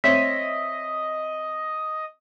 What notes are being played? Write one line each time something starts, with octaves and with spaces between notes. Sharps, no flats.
C4 C#5 D#5 E5 B6